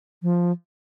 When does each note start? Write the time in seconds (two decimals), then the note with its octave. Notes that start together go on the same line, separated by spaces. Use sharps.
0.23 F3